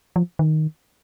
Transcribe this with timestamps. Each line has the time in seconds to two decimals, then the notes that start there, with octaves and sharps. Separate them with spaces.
0.16 F3
0.39 D#3